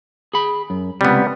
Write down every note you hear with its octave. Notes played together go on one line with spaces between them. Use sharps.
G#4 B5
F#2
C#2 C3 G3 B3